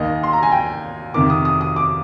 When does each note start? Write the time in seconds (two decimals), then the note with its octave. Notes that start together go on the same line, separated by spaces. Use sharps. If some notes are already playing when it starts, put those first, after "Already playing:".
Already playing: D#2 D#3 D#5
0.23 C6
0.33 A#5
0.43 G#5
0.52 G5
1.14 F2 C3 D#3 D6
1.30 D#6
1.45 D#6
1.61 D#6
1.76 D6